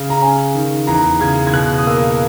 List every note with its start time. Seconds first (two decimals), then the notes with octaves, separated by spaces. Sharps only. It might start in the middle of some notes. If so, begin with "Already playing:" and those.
Already playing: C#3
0.10 A#5
0.22 C#4 G#5
0.55 D#3
0.87 E2 A#5
1.21 C#3 G#6
1.47 G#6
1.54 B2 F#6
1.78 D#6
1.87 A#3 E6